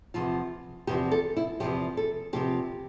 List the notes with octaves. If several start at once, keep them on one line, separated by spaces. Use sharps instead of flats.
E2 C3 F3 F4
E2 C3 F3 G4
A4
E4
E2 C3 F3 G4
A4
E2 C3 F3 G4